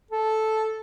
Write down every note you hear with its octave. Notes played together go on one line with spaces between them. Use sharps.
A4